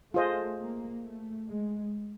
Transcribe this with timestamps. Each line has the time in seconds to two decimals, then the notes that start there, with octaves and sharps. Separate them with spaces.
0.14 A3 F4 G#4 C5 D#5
0.59 A#3
1.03 A3
1.47 G#3